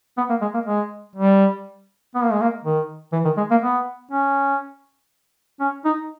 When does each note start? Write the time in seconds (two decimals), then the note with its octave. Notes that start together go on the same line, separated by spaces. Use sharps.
0.17 B3
0.30 A#3
0.41 G#3
0.54 A#3
0.66 G#3
1.16 G3
2.15 B3
2.23 A#3
2.32 G#3
2.41 A#3
2.64 D#3
3.12 E3
3.25 D#3
3.37 G#3
3.51 A#3
3.63 B3
4.11 C#4
5.60 C#4
5.85 D#4